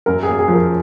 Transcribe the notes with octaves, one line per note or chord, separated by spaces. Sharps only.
F#2 A#4
A#3 G#4
G#4
F3
A#4